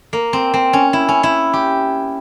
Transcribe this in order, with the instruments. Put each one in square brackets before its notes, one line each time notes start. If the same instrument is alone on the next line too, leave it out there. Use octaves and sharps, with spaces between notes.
[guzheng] A#3
C4
C4
C#4
E4
C#4
E4
G4